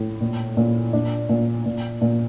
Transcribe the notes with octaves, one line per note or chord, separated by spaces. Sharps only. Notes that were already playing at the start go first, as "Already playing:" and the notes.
Already playing: A2
A#2
A#2
A#2 D4
A#2
A#2
A#2